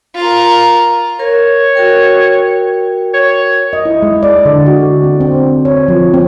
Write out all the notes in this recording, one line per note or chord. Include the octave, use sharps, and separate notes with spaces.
F4 A#4
A#4 C#5
F#4 A#4 G5
C#5
D#5
E4
G#3
D5
D3
F#4
C4
C4
C#5
F3
C4